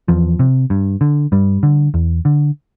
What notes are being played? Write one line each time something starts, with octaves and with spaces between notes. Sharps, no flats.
E2 F3
C3
G2
D3
G2 G3
D3
E2
D3